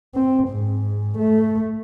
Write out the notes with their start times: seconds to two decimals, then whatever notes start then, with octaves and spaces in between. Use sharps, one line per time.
0.15 C4
0.48 G#2
1.19 A3